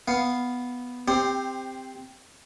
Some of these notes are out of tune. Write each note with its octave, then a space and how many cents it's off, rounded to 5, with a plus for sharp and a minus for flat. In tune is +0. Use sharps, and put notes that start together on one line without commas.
B3 +0 F5 +0
C4 -5 G4 +20 C5 +0